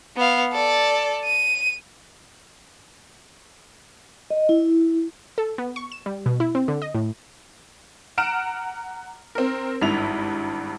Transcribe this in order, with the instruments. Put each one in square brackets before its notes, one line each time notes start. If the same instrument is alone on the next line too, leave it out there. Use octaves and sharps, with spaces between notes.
[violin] B3 F5
A4 D5
D#7
[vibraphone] D#5
E4
[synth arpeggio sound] A4
B3
C#6
E7
G3
B2
E4
C4
D3
D#5
A2
[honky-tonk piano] F#5 A#5 F6 D7 E7
C4 A#4
G#1 G2 E4 F7